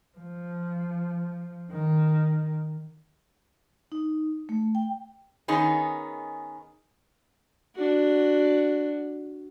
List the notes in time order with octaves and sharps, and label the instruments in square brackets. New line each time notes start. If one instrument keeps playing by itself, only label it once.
[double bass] F3
D#3
[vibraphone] D#4
A3
G5
[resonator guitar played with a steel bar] D#3 B3 C#4 D#4 G#4
[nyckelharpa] D4 F#4